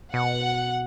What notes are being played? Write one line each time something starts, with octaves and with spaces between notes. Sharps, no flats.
B2 F#5